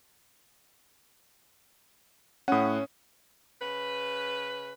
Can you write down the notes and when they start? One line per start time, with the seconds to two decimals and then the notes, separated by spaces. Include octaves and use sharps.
2.48 A2 C#4 F#5 D#6
3.60 C#3 B4